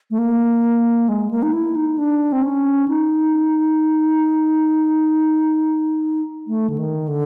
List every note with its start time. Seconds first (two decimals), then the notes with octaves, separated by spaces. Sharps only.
0.11 A3
0.18 A#3
1.09 G#3
1.31 A#3
1.43 D#4
1.53 E4
1.76 D#4
1.98 D4
2.32 C4
2.43 C#4
2.88 D#4
6.47 A3
6.70 D3
6.78 D#3
7.08 D3